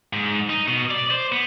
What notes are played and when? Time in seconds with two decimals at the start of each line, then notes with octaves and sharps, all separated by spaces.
0.13 G#2
0.50 D#4
0.68 B2
0.91 D5
1.11 C5
1.32 B3